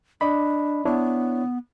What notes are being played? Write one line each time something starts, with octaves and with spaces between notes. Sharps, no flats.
D4 D5 D#5 B5
B3 D4 E4 C#5